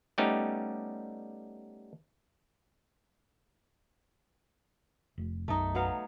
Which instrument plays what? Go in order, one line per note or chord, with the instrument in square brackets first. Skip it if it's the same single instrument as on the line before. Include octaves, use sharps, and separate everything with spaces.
[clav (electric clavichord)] G3 A3 B3 C#4 D#4 G4
[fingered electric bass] F1
[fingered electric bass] B1 F#2 [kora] A3 D#4
[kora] F#3 B3 F5